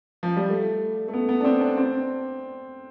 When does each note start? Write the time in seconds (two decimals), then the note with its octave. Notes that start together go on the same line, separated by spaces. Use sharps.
0.23 F3
0.37 G3
0.50 A3
1.08 A3
1.14 B3
1.29 B3
1.41 D4
1.45 C4
1.61 D4
1.78 C4